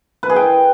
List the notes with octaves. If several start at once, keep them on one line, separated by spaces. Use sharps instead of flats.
B4
G#4
G5